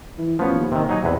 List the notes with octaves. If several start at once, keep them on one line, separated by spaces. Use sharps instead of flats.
E3
A1 F3 B3 C#5
D#2
C3 D#3
F#3 D#4 G#5
E2 C3 B4